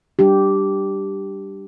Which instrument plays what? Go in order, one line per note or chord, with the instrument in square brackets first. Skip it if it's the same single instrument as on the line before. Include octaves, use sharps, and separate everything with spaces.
[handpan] G3 D4 G4